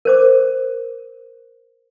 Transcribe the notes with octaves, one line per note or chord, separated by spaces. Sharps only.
A#4 C5 D6